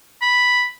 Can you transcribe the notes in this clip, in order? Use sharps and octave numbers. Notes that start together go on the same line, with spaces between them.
B5